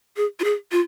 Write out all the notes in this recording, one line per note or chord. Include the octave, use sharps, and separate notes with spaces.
G#4
F4
G#4
F4